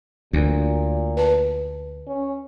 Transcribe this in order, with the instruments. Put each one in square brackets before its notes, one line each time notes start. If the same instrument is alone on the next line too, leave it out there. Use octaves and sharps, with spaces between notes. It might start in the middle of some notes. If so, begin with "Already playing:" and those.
[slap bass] D2 [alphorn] A#2
[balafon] B4 A5
[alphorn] C#4